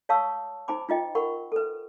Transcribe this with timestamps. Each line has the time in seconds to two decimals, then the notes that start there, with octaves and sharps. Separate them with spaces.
0.09 C#5 F5 A5 C#6 D#6 E6
0.68 D#4 C5 G#5 B5 D6
0.89 D#4 F4 D#5 G5
1.15 A#4 F#5 B5 C#6
1.52 A4 B4